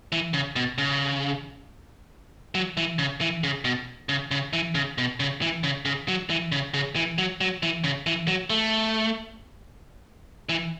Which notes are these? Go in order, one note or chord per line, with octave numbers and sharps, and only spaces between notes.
E3
C#3
B2
C#3
F#3
E3
C#3
E3
C#3
B2
C#3
C#3
E3
C#3
B2
C#3
E3
C#3
C#3
F#3
E3
C#3
C#3
E3
F#3
F#3
E3
C#3
E3
F#3
A3
E3